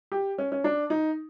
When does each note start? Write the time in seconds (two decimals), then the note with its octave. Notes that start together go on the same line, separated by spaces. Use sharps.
0.12 G4
0.38 C#4
0.52 C#4
0.64 D4
0.90 D#4